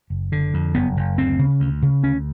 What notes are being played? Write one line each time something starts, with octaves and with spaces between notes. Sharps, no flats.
F#1
D3
F2
F#1 B3
F#1
D2 C4
C#3
D2
C#3
D2 C#4